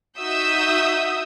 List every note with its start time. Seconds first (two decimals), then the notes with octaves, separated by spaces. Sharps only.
0.19 D#4 F#4 E5 D#6 E6 G6